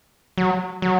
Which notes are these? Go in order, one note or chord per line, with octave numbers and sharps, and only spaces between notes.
F#3
F#3